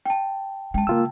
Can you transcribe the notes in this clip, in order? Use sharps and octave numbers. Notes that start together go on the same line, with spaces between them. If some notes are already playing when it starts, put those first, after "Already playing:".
G5 A5
G#3 C#4 G5 A5
C#3 A#3 F4 E6